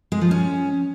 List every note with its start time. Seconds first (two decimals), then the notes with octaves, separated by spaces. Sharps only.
0.12 G#3
0.21 F3
0.31 C#4